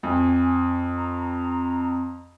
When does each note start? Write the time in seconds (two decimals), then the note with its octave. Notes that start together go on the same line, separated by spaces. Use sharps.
0.03 F2 G#5
0.97 A#5